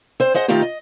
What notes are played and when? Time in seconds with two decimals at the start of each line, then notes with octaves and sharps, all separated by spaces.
0.20 C4 C5
0.34 G#4 C5 D#5 F#5
0.48 D#3 A3 C4 D#4 F4 G4
0.62 D#5